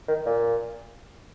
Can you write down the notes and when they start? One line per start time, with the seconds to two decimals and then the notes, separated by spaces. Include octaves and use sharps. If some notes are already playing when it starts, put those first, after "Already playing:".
0.08 D#3
0.25 A#2